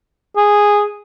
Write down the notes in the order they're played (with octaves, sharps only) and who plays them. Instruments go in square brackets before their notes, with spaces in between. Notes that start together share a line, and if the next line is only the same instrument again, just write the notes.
[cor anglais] G#4